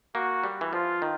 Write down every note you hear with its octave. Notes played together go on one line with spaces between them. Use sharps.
A#3 F#4
G3
E3
F3 F4
D#3